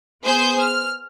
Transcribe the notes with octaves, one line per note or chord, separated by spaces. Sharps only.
B3 G#4 C5 G6
F6